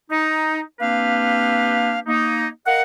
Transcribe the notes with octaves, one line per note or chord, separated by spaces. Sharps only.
D#4
A#3 C4 D4 G4 B4 F5
A#3 D#4
A#4 D#5 F5 F#5